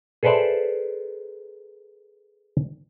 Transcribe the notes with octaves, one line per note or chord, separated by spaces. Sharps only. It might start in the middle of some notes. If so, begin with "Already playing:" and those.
G#4 A4 B4 C5 D5 E5